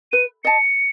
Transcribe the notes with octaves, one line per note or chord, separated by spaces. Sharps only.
B4 D#7
D#5 A5 C#7